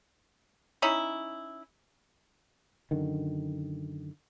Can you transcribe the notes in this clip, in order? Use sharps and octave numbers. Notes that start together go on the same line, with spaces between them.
C#4 D#4 E4
F#2 D3 D#3